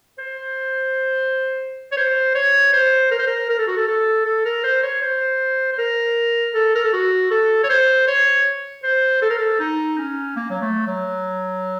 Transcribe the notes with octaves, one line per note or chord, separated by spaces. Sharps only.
C5
C#5
C5
C#5
C5
A#4
C5
A#4
A#4
A4
F#4
A4
A4
A4
A#4
C5
C#5
C5
C5
A#4
A4
A#4
A4
F#4
A4
C#5
C5
C#5
C5
A4
A#4
A4
D#4
C#4
A#3
F#3
A3
F#3